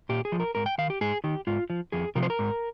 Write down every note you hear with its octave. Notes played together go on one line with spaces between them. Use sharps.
A#2 G4
G#4
F3
A#4
G#2 A#4
G5
D#3 F5
G4
G#2 G#4
D#3 G4
G#2 F4
F3
F2 G#4
C3 F3 A#4
C5
A#4
G#2